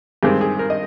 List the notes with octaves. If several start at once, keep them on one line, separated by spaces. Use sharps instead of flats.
G2 D#3 G#3 C4 G4
G#4
A#4
D#5